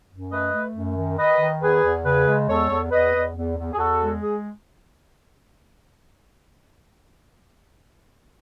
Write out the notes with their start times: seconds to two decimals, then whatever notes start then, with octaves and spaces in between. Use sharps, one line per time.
0.10 F#2
0.31 A3 B4 D#5
0.53 A3
0.75 F#2
0.96 D#3
1.18 D#3 B4 D#5
1.40 D#3
1.62 E2 G#4 B4
1.83 E2
2.05 C#3 G#4 B4
2.27 G#3
2.49 E2 A4 C#5
2.70 E2
2.91 E2 B4 D#5
3.14 E2
3.36 E2
3.57 E2
3.73 G#4
3.78 E2 F#4 A4
4.00 G#3
4.22 G#4